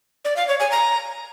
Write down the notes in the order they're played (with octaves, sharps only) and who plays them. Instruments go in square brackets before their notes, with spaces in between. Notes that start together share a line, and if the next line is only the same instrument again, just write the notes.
[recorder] D5
F5
C#5
G#5
A#5